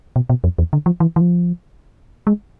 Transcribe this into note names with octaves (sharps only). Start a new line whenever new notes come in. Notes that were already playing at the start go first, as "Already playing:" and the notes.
B2
B2
F2
E2
D3
F3
E3
E3
F3
G#3